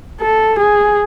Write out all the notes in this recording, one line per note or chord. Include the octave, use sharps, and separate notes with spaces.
A4
G#4